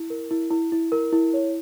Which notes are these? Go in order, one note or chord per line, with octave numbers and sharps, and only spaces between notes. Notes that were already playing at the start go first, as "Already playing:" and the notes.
Already playing: E4
A#4
E4
E4
E4
A#4
E4
C#5